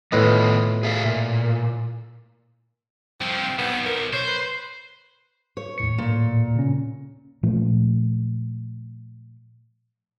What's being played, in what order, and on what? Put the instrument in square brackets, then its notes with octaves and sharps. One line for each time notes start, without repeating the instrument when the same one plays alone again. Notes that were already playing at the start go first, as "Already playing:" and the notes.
[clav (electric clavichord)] A2 B4 D#5 [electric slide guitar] D#3 B3 F4
[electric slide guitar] G#4 E5 F5
A#2
[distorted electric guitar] C2 F3 [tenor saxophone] C4
[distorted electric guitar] B1 [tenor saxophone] B3
[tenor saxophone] A#4
[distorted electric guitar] C5 [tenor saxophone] C#5
[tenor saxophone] B4
[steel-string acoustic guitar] C#5
[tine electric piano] D#2 A2 C#7
[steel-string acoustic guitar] A#2
[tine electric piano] C#3 C#4
[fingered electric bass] A#2 F3 A3